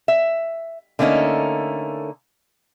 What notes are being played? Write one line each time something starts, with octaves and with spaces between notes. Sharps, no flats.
E5
D3 A3 A#3 C#4 D#4